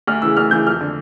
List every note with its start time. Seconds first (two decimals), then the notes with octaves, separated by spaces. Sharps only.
0.07 D2 F6
0.22 C#3 E3 E6
0.36 D2 F6
0.51 C#3 E3 G6
0.66 F2 F6
0.80 D3